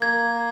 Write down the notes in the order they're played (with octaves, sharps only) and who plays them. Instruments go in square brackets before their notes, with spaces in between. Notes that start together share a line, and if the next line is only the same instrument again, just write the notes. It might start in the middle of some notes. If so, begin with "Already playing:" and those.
[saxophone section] A#3 [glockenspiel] G#6